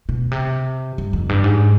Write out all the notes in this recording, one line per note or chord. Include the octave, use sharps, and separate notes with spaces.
B2
C3
G2
F2
G2
G#2